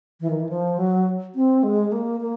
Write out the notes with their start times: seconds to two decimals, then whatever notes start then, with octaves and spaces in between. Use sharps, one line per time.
0.21 E3
0.30 D#3
0.40 E3
0.49 F3
0.78 F#3
1.35 C4
1.63 G#3
1.92 A#3
2.21 A#3